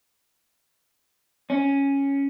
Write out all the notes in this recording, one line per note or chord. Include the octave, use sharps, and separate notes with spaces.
C#4